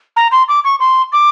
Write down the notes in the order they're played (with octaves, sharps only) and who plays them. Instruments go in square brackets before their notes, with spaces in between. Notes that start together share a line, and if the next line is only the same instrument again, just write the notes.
[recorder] A#5
C6
D6
C#6
C6
D6